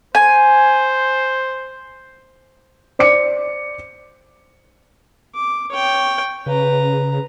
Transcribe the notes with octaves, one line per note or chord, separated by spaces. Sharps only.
C5 G#5
C5 D5 D6 C#7
D6
C#5 G5
C#3 B4 A#5